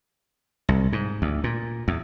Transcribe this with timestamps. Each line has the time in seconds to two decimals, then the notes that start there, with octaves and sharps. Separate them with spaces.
0.69 C2
0.93 G#2
1.22 D2
1.44 A#2
1.88 E2